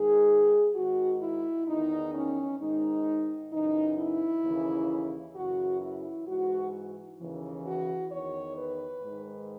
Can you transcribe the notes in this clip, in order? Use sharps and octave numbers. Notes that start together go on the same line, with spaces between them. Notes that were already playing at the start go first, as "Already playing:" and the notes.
Already playing: G#2 D#3 G#4
G#2 D#3 F#4
E4
E2 D#3 D#4
C#4
G#2 D#3 D#4
F#2 C#3 E3 D#4
E4
D#2 C#3 E3
F#2 C#3 E3 F#4
E4
G#2 E3 F#4
D#2 C#3 E3
F#4
E2 D#3 C#5
B4
G#2 D#3